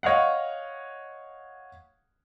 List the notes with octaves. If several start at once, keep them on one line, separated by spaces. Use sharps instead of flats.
C#5 D#5 F5 F#5